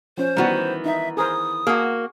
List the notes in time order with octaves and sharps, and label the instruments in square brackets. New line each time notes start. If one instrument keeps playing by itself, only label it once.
[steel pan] F3 C#4 [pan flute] C5
[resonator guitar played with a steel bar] D#3 E3 B3 [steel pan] G3 F#4
[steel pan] D#4 [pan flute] E5
[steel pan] G#4 A#4 C5 [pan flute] D#6
[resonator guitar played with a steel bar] A#3 F#4 [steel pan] G#4